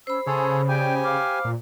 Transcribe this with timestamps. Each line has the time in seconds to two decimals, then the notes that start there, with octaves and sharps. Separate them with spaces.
0.07 C#4 C5 B5 E6
0.27 C#3 G#4 A4 C#5 G#5 C6
0.69 G4 D5 G5 G#5 G6
1.03 F5 D6 F6
1.45 A#2